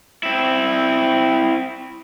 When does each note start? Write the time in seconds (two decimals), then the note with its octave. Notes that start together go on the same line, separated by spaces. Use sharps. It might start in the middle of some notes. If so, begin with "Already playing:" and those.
0.23 C4 E4